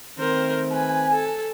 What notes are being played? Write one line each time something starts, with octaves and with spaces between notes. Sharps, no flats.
D#3 A3 C4 A#4 C5
B4 G#5
A4